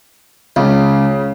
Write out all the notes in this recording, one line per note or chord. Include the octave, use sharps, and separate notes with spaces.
C#2 C#3